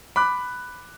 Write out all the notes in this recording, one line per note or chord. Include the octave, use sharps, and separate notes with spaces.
B5 D6 F#6